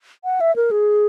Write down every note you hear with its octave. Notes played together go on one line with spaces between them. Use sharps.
F#5
E5
A#4
G#4